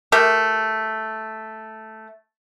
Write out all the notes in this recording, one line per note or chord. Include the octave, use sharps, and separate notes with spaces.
A3 G4 A#4